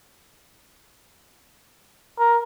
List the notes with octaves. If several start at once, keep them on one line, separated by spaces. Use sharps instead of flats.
A#4